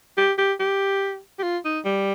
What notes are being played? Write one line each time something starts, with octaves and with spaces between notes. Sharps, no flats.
G4
G4
G4
G4
F4
D#4
G3